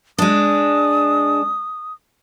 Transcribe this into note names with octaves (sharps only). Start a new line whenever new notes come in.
G#3 D4 D#6